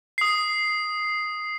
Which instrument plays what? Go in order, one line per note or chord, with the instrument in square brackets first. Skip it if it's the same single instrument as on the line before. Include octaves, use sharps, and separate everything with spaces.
[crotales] D#6 C7